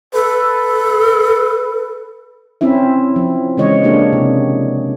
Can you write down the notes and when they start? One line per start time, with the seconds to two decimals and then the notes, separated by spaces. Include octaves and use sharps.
0.14 A4 B4
2.61 C4 C#4 E4 E5
3.16 F3
3.57 C#3 E3 G#3 C#5 D#5
3.83 A#3 D4 G4 G#4
4.13 C3